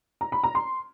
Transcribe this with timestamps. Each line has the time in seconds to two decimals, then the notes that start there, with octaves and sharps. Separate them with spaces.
0.21 A#5
0.32 B5
0.44 A#5
0.55 C6